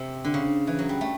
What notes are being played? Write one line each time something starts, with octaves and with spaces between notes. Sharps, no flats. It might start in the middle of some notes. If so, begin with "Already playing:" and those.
Already playing: C3
D3
C#3
E3
F#3
G3
A3